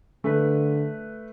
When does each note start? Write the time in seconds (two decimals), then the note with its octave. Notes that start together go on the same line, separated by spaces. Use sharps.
0.24 D3 A3 B4